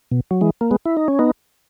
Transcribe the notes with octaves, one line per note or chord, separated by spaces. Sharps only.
B2
F#3
E3 G#3
A#3
G#3 B3
E4
D#4
C#4
B3 D#4